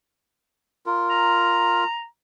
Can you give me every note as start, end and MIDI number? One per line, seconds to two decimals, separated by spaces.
0.86 1.84 65
0.86 1.84 70
1.10 2.05 82